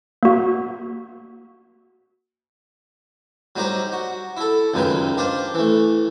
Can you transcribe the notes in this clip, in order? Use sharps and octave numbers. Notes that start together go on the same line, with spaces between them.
A#3 F#4
F#3 G3 D#4 G4 C5
F#4
E4 A4
C#2 F#2 D#3 G#3 B4 G5
D4 F4 G4 C5
E3 A3